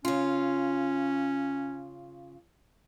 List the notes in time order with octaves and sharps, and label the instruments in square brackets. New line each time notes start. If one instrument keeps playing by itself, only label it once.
[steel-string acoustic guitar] C#3 F4 [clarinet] C#4